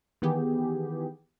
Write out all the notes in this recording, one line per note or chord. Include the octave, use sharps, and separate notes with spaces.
D#3 E3 B3 G4 G#4